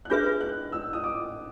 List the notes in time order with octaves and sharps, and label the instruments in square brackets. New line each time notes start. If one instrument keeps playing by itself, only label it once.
[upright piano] F#6
[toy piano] D4 F4 G#4 B4 E5 [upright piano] G6
[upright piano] F#6
E6
D#6
D6